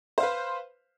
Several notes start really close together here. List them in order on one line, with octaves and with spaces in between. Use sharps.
C5 F5 B4